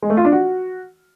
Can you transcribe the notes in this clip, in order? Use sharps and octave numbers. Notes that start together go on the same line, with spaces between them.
G#3
A3
F4
D4
F#4